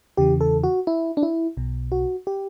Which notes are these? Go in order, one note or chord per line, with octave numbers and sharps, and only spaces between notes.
E2 C#3 E3 G4
A4
F#4
E4
D4
E4
B1 B2
F#4
G4